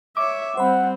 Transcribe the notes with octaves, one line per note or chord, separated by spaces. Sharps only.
C#5 E5 D6
G3 C4 C5 F#5 B5